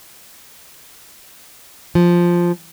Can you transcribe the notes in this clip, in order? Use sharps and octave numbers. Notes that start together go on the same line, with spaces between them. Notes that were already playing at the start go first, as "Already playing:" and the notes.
F3